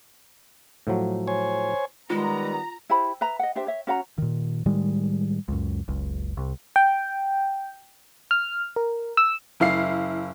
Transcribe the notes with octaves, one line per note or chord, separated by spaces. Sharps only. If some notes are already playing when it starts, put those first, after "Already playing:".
A2 F3 F#3
C5 C#5 G#5
D#3 G3 G#3 B3 F4 A#5
E4 G4 C5 B5
B4 E5 A#5
D#5 F#5
D4 G4 C5 E5
C#5 E5
C#4 F#4 F#5 A#5
A#2 D#3
A2 D#3 G3 G#3
C#2 F#2
F#1 C#2
C2
G5
F6
A#4
E6
F#1 E4 F5 C7